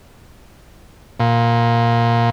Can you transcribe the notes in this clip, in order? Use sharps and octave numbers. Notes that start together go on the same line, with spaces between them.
A#2